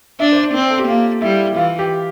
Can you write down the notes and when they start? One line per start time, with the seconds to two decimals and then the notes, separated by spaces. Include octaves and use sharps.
0.20 D4 E5
0.32 C5
0.37 D5
0.54 C4 C5
0.70 A4
0.79 G4
0.88 A#3 F4
1.22 G3 E4
1.56 E3 F4
1.79 G4